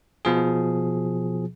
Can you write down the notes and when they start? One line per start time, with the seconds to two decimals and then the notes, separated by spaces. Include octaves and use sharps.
0.25 B2 F3 G#4